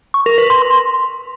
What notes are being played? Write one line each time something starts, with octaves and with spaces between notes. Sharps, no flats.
C#6
A#4
B4
C6
C6